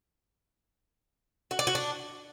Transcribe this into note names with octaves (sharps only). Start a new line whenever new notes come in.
F#4
D5
F#4
D4